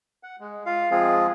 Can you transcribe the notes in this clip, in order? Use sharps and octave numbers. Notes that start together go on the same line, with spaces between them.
F#5
G#3
F4 F5
F3 G#3 C4 F4 G#4